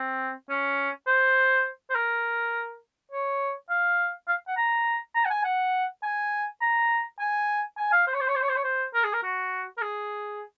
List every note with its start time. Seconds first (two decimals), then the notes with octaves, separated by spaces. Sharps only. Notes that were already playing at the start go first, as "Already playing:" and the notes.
Already playing: C4
0.49 C#4
1.07 C5
1.90 C5
1.95 A#4
3.11 C#5
3.70 F5
4.28 F5
4.47 F#5
4.57 A#5
5.15 A#5
5.25 F#5
5.30 G#5
5.44 F#5
6.03 G#5
6.61 A#5
7.19 G#5
7.78 G#5
7.92 F5
8.07 C5
8.14 C#5
8.21 C5
8.28 C#5
8.35 C5
8.42 C#5
8.49 C5
8.56 C#5
8.64 C5
8.94 A#4
9.04 G#4
9.13 A#4
9.23 F#4
9.78 A#4
9.81 G#4